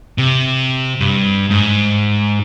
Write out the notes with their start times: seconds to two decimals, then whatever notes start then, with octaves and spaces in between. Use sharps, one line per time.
0.18 C3
1.01 G2
1.50 G#2